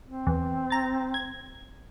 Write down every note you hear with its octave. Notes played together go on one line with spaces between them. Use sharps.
C4
E2
A#5 A6
G#6